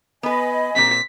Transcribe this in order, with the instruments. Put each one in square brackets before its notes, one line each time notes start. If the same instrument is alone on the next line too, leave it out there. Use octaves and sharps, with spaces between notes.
[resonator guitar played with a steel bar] B3 B4 [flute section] D#5 G#5 B5
[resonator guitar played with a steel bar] A#2 C4 [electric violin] B6